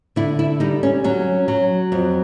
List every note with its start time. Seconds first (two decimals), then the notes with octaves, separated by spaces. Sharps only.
0.16 D3 E4
0.39 E4
0.60 G3 D#4
0.83 C#4
1.04 F#3 C#4
1.48 F#3
1.92 F2